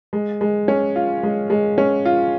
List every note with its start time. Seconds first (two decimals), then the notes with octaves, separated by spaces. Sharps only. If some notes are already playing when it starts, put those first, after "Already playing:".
0.13 G#3
0.41 G#3
0.68 C#4
0.96 F4
1.23 G#3
1.50 G#3
1.78 C#4
2.05 F4